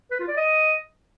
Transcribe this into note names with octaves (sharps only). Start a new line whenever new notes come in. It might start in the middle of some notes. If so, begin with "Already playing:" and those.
B4
F4
D5
D#5